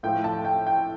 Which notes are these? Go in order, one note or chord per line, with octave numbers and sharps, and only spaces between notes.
A2 F3 A3 G5
A5
G5
G5